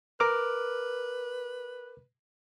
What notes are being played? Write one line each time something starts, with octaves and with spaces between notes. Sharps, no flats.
A#4 B4 D6 F6